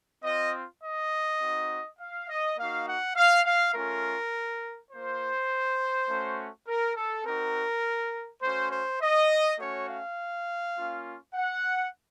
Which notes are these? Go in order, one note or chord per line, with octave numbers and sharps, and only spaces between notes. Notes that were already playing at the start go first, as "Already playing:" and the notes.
C4 F4 D#5
D#5
C4 D#4 F#4
F5
D#5
A#3 D#4 F#4 F5
F#5
F5
F5
A3 C#4 F4 A#4
A#3 F4 C5
A3 C#4 F#4
A#4
A4
C4 D#4 F#4 A#4
A3 C#4 F#4 C5
C5
D#5
A3 C#4 F#4 C#5
F5
A#3 C#4 F4
F#5